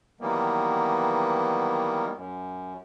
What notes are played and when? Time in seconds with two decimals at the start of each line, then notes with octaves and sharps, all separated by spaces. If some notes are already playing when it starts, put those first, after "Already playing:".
0.21 D#3 E3 F#3 G3 A#3 B3
2.15 F#2